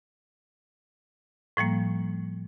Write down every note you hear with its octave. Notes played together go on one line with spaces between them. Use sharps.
A2 F3 G3 A#3